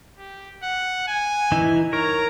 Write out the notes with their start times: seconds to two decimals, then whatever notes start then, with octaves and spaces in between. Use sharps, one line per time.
0.18 G4
0.63 F#5
1.08 G#5
1.52 E3 D#4 E4
1.93 A#4 C#5 A#5